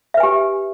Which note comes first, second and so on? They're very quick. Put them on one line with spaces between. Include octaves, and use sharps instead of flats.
E5 B4 G#5 G4